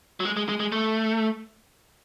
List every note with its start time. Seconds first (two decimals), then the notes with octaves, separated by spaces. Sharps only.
0.20 F#3
0.25 G#3
0.37 G#3
0.49 G#3
0.60 G#3
0.72 A3